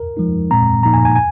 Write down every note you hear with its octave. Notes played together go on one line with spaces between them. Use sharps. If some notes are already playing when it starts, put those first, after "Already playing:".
Already playing: A#4
F3 G#3 D#4
A#2 G#3 C4 A#5
A#2 F3 A#3 D#4 A#5
G#5
G#5
G#5